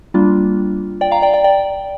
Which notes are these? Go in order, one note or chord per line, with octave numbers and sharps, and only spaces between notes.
G3 A#3 D4 F4
D5 G5
F5 A#5
D5 G5
D5 G5
D5 G5